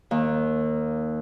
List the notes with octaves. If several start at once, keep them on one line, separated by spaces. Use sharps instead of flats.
D#2